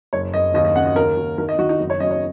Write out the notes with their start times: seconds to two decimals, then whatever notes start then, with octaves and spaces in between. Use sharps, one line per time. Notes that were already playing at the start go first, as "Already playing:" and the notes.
0.13 F#1 C#5
0.34 F#1 D#5
0.54 D#2 D#5
0.65 D#5
0.76 C#3 F#5
0.86 D#5
0.96 D#2 A#4
1.17 D#2
1.38 D#3 A#4
1.49 D#5
1.59 D#3 F#4
1.69 D#4
1.79 F#1
1.90 C#5
2.00 F#2 D#5
2.11 C#5